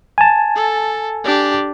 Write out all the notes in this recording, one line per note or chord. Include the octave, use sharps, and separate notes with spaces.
G#5 A5
A4
D4 G4